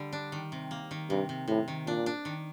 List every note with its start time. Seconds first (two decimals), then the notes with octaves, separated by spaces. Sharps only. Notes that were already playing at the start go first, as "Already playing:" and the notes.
Already playing: D3 G3
0.13 D4
0.32 D#3
0.52 C3
0.71 A#3
0.91 D#3
1.10 G2 C3
1.29 C3
1.48 A2 C3
1.68 D#3
1.87 A#2 D4
2.06 D4
2.25 D#3